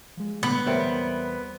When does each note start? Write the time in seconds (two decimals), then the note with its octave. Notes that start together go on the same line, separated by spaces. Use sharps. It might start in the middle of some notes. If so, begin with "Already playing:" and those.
0.17 F3 G#3
0.43 A#2 D3 A3 B3
0.66 E2 G3 C4 A#4 C#5 E5